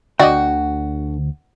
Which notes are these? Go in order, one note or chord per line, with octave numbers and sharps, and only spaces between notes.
D2 D3 F#4 D5 D#5 G5